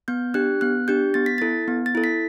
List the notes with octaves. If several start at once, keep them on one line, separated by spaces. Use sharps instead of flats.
B3 G6
D4 G4 F#6
B3 F#6
D4 G4 G6
B3 A6
B6
E4 A4 A6
B3
A6
E4 A4
B6